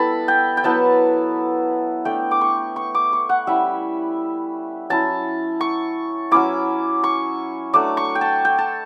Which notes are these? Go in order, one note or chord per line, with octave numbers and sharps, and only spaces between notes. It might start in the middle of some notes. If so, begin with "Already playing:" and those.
Already playing: G3 B3 E4 A4 A5 B5
G5
G5
F#3 B3 E4 A5
A3 D4 G5
D6
C#6
C#6
D6
C#6
F#5
G3 C#4 E4 E5
F#3 C#4 E4 A5
C#6
F#3 C#4 E4 D6
C#6
F#3 A3 D4 D6
C#6
G5
A5
G5
A5